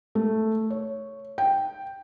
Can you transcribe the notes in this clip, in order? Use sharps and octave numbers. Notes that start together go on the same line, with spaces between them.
A3
C#5
G5